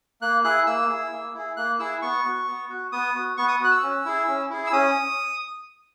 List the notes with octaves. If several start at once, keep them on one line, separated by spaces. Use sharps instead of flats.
A#3 F#6
E4 G#4 F#6
A#3 E6
E4 G#4
A#3
E4 G#4
A#3 F#6
E4 G#4 E6
B3 C#6
F#4
B3
F#4
B3 D#6
F#4
B3 C#6
D#6
F#4 F#6
E6
C#4
E4 G#4
C#4
E4 G#4
E6
C#4 D#6